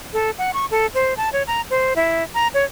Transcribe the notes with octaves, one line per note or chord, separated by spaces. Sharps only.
A4
F#5
C#6
A4
C5
A5
C#5
A#5
C5
E4
A#5
C#5